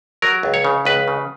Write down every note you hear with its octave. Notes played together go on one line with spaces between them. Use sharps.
F#3 A#4
C#2
C#5
C#3
C#2 B4
C#3